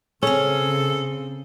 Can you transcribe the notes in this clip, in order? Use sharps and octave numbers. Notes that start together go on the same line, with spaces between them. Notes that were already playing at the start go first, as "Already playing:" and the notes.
C#3 C4 C#4 G#4 A4